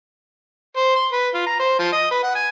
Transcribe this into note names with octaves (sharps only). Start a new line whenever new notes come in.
C5
C6
B4
F4
A#5
C5
F3
D#5
B4
F#5
G#5